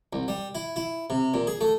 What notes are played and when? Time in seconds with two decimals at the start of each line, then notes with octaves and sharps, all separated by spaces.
0.13 C2
0.28 G3
0.55 E4
0.76 E4
1.10 C3
1.34 A#2
1.47 G#4
1.61 A3